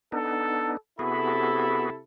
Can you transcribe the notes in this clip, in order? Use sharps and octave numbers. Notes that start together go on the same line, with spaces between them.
B3 D4 D#4 A4
C3 B3 E4 F#4 G#4 A4 B5